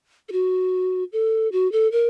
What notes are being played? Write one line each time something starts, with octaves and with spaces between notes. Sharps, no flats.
A4
F#4
A4
F#4
A4
A#4